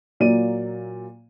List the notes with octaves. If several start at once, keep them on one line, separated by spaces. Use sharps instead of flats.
A#2 F#3 A#3 D5 D#7